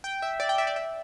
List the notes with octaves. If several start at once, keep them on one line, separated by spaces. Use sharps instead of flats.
G5
E5
D5
G5
E5
D5
E5